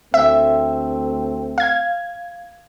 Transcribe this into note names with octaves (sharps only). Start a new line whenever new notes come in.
D2 A3 C4 E5
F5 G#6